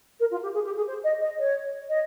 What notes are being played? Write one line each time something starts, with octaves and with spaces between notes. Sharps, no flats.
A#4
F4
G4
G#4
G4
G#4
C5
D#5
D#5
C#5
D#5